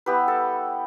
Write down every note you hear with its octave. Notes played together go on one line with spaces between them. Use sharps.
G3 B3 E4 G4 B4
A4